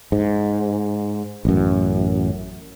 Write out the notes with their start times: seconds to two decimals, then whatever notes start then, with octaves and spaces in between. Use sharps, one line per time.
0.12 G#2
1.45 A1 F#2